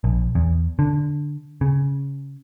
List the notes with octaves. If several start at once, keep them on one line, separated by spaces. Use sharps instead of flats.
A#1
E2
D3
C#3